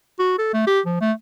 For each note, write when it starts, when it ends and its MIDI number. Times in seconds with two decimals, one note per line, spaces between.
0.19 0.34 66
0.39 0.51 69
0.54 0.67 57
0.67 0.80 67
0.86 0.97 53
1.01 1.12 57